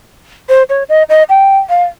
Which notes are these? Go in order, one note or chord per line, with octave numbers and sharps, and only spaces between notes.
C5
C#5
D#5
D#5
G5
F5